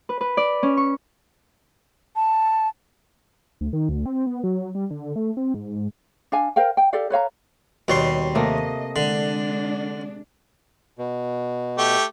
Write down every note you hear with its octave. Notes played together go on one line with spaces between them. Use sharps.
B4
B4
D5
C#4
C#6
A5
D2
D#3
D2
C4
B3
F#3
G3
D3
A3
C4
G#2
G#2
D4 F5 G#5
A#4 C5 F5 G5
G5
G4 A4 D5 F5
B4 C#5 F5 A#5
D#2 B2 G3 C#5 C6
C3 A3 A#3 D#5
D3 G#3 D4
B2
A3 G4